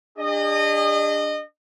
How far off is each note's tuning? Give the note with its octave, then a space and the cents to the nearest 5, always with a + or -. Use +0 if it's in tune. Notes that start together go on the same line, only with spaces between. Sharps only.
D4 +0 G#4 -45 D#5 -25